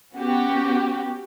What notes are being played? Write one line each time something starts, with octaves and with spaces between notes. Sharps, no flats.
B3 C#4 F#4 G4